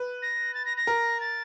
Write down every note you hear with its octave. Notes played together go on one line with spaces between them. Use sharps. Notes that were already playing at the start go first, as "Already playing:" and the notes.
Already playing: B4
A#6
A6
A#6
A#6
A#4
A6